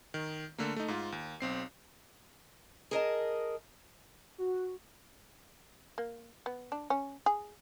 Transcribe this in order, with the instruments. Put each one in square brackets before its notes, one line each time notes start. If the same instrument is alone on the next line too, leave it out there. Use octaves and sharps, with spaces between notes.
[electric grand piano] D#3
D3 A3 A#3
A3 D#4
G#2 F4
D#2
B1 C4 C7
[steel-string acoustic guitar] G#4 A#4 D#5 A5
[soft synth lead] F#4
[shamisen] A#3
B3
D4
C#4
G#4